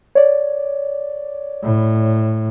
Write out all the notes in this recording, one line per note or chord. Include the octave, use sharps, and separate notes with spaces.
C#5 D5
A2